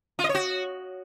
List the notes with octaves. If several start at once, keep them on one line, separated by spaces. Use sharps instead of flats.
F4
D#5
C#5
F#4